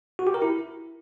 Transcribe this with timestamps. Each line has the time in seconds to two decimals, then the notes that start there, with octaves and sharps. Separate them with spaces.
0.19 F#4
0.27 G4
0.34 A#4
0.42 E4